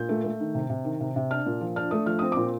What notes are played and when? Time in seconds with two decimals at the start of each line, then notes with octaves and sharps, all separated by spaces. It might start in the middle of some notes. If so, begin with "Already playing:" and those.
Already playing: A#2 G6
0.09 A3
0.24 A3
0.40 D#3
0.55 C3
0.70 C3
0.85 D#3
1.00 C3
1.16 C3
1.31 D4 F6
1.46 A#2
1.61 F3
1.76 D4 F6
1.91 A3 D#6
2.06 F3 F6
2.19 C4 D#6
2.32 A#2 D6